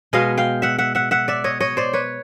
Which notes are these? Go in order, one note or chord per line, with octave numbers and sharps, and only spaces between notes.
B2 G#3 B3 D#5 F5
F5 G5
E5 F#5
E5 F#5
E5 F#5
E5 F#5
D5 E5
C#5 D#5
C#5 D#5
C5 D5
B4 C#5